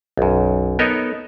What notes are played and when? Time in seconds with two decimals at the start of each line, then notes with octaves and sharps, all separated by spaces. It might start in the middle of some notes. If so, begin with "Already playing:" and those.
0.17 B1 F#2
0.79 B3 D#4 A4 A#4 C#5 D#5